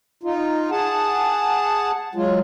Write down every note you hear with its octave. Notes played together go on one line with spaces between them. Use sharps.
D#4 F4
G#4 F#5 A5
F#3 G#3 F4